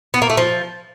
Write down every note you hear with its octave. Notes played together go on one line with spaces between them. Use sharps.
B3
A#3
A3
F3